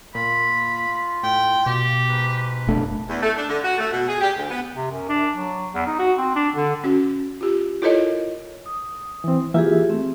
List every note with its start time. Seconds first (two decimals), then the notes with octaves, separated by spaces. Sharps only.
0.15 A#2 F4 B5
1.23 A2 G5
1.66 B2 G4
2.09 G#2 B4
2.67 F#1 A3 D4
3.09 E2
3.22 A3
3.36 D4
3.49 D3
3.64 F#4
3.78 A3
3.92 B2
4.08 G#4
4.21 G4
4.37 D2
4.50 B3
4.75 C3
4.90 F#2
5.09 D4
5.36 F#3
5.74 E2
5.86 D#4
5.99 F#4
6.18 C4
6.35 D4
6.55 D3
6.84 C#4 F#4
7.41 F4 G4
7.82 E4 F4 A4 A#4 C#5 D#5
8.66 D#6
9.24 E3 C4
9.54 E3 A#3 F4 G4 G#4 E5
9.90 A3 C4